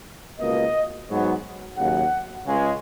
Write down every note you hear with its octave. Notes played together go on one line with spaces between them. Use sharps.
C#2 B2 A#3 D#5
G#2 F#3 B3
D#2 C#3 F#3 F#5
C#2 C#3 G#3